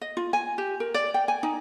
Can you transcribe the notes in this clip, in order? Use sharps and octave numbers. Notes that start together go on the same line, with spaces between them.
D#5
F4
G#5
G4
A#4
D5
G5
G#5
D#4